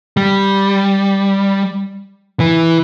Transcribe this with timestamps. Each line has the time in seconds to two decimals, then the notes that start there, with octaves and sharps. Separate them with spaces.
0.17 G3
2.40 E3